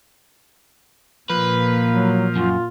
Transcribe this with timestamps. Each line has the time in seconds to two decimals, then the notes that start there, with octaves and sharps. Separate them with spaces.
1.30 A#2 F3 A#3 B4
1.91 F#3
2.36 F#2 F4